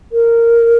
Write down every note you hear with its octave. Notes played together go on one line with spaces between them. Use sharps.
A#4